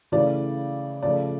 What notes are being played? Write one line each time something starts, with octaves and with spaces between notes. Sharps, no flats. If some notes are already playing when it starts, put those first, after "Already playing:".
C#3 E3 A3 D5
C#3 F3 A3 D5